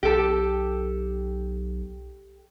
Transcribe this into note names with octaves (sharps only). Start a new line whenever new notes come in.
B1 G4 A4